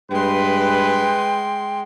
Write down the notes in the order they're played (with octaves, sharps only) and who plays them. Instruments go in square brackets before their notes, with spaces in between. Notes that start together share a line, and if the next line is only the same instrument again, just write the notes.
[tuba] G2 [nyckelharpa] G#3 C6 [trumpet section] B4 [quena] G5